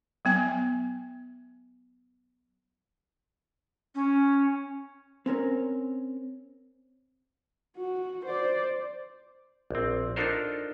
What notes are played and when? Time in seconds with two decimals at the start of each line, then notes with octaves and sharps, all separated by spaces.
0.25 F#3 B3 G#5
3.95 C#4
5.26 C4 C#4 A#4 C#5
7.77 F#4
8.25 C5 D5
9.71 A#1 C4
10.16 D4 D#4 F4 A4 A#4 C5